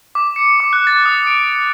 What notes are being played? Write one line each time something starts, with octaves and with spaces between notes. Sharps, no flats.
D6
C#7
D6
F#6
A6
D#6
D7
C#7